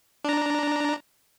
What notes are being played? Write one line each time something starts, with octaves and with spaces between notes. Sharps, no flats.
D4 A#5